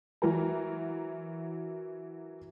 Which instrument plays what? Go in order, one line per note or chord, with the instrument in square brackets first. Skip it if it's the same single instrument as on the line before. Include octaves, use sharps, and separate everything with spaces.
[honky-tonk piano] E3 F#3 A#4 A#5